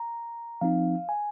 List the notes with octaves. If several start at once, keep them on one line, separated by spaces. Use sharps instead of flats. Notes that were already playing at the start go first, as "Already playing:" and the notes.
Already playing: A#5
F3 C4 D#4 F5
G#5